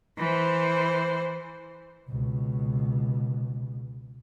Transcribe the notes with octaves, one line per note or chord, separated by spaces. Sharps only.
E3 C5
C#2 B2